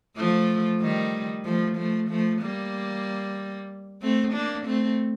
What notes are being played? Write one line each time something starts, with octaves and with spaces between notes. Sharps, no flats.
F3 A3
D#3 G3
F3 A3
F3 A3
F3 A3
G3 A#3
A3 C4
A#3 D4
A3 C4